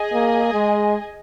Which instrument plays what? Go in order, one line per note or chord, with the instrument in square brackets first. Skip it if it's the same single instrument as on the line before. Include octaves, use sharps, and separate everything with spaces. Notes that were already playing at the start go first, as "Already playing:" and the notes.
Already playing: [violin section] G#4 D#5 G#5
[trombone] A#3
G#3